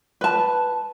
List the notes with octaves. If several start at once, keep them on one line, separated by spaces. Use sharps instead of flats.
B4 A5